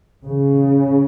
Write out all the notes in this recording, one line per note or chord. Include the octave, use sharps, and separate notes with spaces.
C#3